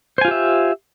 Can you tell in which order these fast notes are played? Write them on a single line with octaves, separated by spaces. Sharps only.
C5 G#5 F4 G4 E5